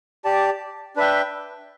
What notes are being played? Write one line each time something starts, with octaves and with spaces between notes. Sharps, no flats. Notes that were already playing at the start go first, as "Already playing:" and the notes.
G4 D5 A5
D4 B4 E5 G5